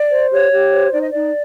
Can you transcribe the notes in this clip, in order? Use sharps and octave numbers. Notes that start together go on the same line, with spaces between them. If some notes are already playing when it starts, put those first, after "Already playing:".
Already playing: D5
C5
G4 C#5
G4
C5
D#4 D5
D#5
D#4 D5